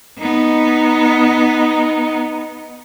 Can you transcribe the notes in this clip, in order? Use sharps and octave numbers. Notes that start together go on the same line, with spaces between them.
B3 D#4